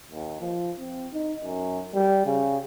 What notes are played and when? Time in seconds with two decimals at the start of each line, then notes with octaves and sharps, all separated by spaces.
0.11 D#2
0.41 F3
0.79 C4
1.13 D#4
1.43 F#2
1.94 G3
2.26 C#3